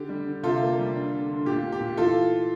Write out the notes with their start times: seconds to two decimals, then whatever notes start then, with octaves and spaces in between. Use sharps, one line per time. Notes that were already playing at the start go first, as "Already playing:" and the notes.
Already playing: D3 G4
0.09 G3
0.26 D3
0.43 C3 F4 A4
0.61 A#3
0.78 G3
0.95 D4
1.12 D3
1.29 D3
1.46 A#2 G4
1.63 A#2
1.72 G4
1.80 A#2
1.97 E3 F4 A4